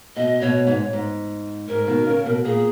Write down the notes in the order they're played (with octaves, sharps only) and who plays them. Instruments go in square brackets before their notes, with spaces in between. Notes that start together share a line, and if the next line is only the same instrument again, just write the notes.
[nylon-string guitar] B2 [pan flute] D#5
[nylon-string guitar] B2 [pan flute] C#5
[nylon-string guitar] G#2 [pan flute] C#5
[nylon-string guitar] G#2
[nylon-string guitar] G#2 [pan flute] A#4
[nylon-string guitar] B2 D#3
C#3
B2
[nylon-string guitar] A#2 [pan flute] G#4